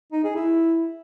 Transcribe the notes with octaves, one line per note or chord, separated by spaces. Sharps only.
D#4
G#4
E4